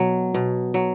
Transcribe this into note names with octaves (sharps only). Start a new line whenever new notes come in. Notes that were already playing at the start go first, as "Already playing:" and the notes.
Already playing: B2 F#3
B2
F#3